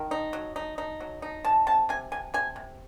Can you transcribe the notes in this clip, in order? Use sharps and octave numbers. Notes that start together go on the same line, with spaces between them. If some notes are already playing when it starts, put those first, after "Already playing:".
Already playing: D#3
D#4
F#3
D#4
D#4
F#3
D#4
C3 A5
C3 A5
C3 G#5
C3 G#5
C3 G#5
C3